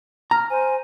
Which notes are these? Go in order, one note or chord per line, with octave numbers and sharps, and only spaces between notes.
A#5 F6
C5 G#5